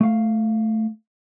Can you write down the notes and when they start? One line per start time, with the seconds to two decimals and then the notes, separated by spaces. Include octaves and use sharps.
0.01 A3 F5